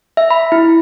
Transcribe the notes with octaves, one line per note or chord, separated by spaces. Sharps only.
E5
B5
E4